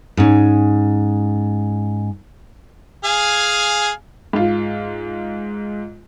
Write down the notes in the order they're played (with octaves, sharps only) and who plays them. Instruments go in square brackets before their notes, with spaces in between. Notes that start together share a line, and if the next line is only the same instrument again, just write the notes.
[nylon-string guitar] G#2 C#4
[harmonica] G#4 F5 G#5
[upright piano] G#2 F4